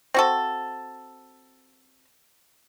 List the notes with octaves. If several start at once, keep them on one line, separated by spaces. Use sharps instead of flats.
C4 F#4 A4